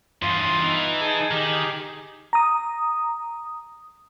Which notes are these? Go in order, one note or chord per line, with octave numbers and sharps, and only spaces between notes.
E2 G2 F4 C6 D#6
E3 D#4
G#4 G#5 A5
D#3 G4 G#4
A#5 D#6